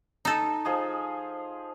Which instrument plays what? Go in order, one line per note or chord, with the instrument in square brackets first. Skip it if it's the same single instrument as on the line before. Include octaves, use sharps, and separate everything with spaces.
[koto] D#4 A4
[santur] F3 G#4 D#5